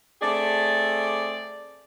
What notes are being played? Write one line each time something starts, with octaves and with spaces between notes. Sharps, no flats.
A3 C4 G#4 D5